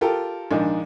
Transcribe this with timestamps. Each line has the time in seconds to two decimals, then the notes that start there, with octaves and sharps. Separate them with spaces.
0.01 F4 G4 A4 A#4
0.51 A#1 G#2 D#3 D4 D#4